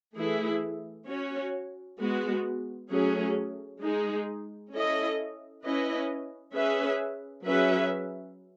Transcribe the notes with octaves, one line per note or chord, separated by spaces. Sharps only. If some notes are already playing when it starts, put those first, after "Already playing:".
E3 A3 E4 G#4
C#4 F#4 C#5
G#3 B3 F#4
F#3 A3 C#4 G#4
G#3 D#4 G#4
C#4 E4 A4 D#5
C#4 E4 B4 D#5
C#4 G#4 B4 E5
F#3 C#4 G#4 B4 E5